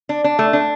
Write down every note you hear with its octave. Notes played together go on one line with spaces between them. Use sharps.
D4
D4
A3
D4